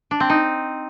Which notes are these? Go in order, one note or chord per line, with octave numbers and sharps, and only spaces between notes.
D4
C4
D#4